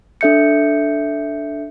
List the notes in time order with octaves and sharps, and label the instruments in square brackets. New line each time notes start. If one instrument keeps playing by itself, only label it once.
[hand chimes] D4 A4 E5 G6 C#7